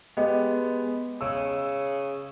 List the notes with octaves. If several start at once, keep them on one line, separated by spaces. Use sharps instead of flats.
G#3 B3 G4 D#5
C#3 E6